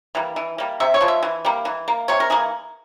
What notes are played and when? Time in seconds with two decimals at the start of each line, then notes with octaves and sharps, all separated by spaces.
0.15 E3 G3 A#3
0.36 E3
0.58 G3 A#3
0.80 C3 E5
0.94 C#5
1.01 F3 G#3
1.08 E5
1.23 E3
1.45 G3 A#3
1.65 E3
1.88 A#3
2.08 C3 C#5
2.20 A#4
2.30 E3 A#3 G#4